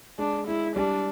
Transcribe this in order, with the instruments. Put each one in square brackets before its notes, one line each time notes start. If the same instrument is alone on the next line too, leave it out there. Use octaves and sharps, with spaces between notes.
[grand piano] G#3 [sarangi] D4
[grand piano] G#3 [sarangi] E4
[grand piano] G3 [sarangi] D4